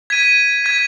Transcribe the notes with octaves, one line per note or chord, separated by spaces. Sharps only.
G#6 B6 D#7
G#6 B6 D#7